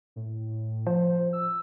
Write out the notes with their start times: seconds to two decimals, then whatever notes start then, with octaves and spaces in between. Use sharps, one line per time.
0.16 A2
0.87 F3 C5
1.33 E6